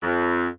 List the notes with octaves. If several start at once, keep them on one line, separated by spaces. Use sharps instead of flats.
F2